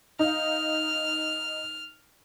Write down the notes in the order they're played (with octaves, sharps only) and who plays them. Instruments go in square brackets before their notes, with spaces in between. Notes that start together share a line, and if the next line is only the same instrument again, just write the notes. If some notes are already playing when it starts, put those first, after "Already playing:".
[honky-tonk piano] D#4 F5 [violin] F6